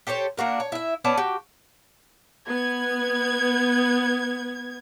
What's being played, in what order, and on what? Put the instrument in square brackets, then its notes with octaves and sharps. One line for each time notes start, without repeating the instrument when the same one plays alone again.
[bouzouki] G4 A4 C5 C#5
A#3 D4 F#4 A#4
C#5
E4 E5
B3 C#4 D5 A5
F#4 G4
[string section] B3 G#6